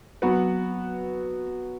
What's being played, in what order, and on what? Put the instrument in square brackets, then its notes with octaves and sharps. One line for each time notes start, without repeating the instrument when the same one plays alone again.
[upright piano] F#3 B3 F#4 B4